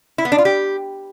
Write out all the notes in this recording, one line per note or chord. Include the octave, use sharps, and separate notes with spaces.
E4
B3
D4
F4
G4